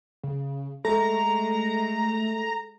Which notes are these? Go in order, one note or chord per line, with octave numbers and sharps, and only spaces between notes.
C#3
G#3 A3 A4 A#5